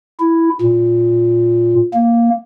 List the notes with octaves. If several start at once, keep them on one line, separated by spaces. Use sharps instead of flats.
E4
A#2
A#3